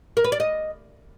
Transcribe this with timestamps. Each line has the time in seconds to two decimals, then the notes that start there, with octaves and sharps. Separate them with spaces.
0.17 A#4
0.24 B4
0.32 D5
0.40 D#5